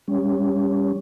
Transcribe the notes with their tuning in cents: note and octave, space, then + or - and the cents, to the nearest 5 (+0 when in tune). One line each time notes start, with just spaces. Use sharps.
G3 +20 C#4 +15